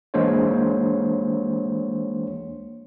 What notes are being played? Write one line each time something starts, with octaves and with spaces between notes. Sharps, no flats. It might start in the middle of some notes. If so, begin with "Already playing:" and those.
E3 G#3 A#3 D4 C5 C#5